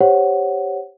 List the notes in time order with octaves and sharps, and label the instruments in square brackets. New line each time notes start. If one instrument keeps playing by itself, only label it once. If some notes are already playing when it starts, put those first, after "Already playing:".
[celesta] G4 C5 C#5 F#5